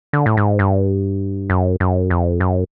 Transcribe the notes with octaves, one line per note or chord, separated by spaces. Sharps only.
D3
A2
G#2
G2
F#2
F#2
F2
F#2